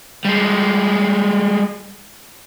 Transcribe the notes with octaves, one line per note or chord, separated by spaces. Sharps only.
G3 G#3